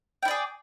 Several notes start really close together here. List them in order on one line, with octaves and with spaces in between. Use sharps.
G5 E4 D5 G#4